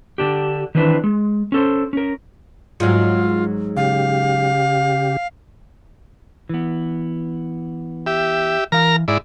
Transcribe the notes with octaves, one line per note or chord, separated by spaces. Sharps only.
D3 D4 G4
D#3 E3 C4 D4 B4
G#3
C#4 A4 C5
C#4 A#4
G#2 F#3 F4
C#3 G4 F5
E3 B3
G4 E5
E3 A#4 F5 A#5 F6
G#2 E4 D5